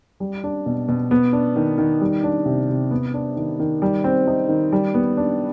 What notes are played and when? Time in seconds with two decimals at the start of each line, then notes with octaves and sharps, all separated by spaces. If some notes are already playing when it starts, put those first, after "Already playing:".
0.20 G3
0.44 D4
0.66 B2
0.88 B2
1.11 B3
1.33 D4
1.56 D#3
1.78 D#3
2.01 G3
2.24 D4
2.46 C3
2.69 C3
2.91 B3
3.14 D4
3.36 D#3
3.60 D#3
3.82 G3
4.04 C4
4.27 D#4
4.49 D#3
4.72 G3
4.94 B3
5.17 D4